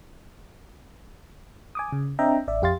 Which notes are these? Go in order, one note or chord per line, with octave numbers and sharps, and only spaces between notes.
G#5 D6 D#6
C#3
C4 D4 D#5 E5 G5 A#5
A1 D5 E5
F2 G4 F5 C6 A6